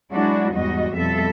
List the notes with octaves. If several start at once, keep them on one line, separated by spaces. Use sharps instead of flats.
F#3 G#3 D4 E4 F#4
E2 G#2 G3 F#4 D#5
F2 B2 G3 A4 E5